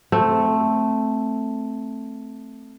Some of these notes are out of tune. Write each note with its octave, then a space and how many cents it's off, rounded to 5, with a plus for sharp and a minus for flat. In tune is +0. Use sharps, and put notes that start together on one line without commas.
A3 +0 C4 +0